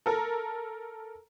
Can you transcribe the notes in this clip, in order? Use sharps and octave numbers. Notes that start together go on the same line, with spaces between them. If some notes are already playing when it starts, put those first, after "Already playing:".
A4 A#4